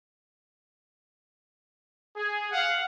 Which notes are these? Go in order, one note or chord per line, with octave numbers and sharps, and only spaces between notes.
G#4
F5 F#5